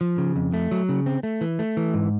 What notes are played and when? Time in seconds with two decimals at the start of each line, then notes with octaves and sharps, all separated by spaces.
0.01 F3
0.18 C#3
0.36 F2
0.54 A3
0.71 F#3
0.89 C#3
1.06 C4
1.23 A3
1.41 E3
1.59 A3
1.77 E3
1.94 G#2